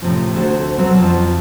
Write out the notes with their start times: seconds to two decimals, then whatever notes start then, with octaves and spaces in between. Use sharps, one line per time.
0.02 A2 C3 F3
0.35 D2 A3 D4 F#4 A4 C5
0.78 B2 F#3 G3 C4 F#4
0.96 F2 F4 A5